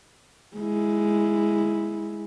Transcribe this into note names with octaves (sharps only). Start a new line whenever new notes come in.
G#3 E4